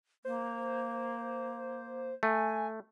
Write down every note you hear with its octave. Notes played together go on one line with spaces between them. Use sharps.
A#3 C5
A3 G#5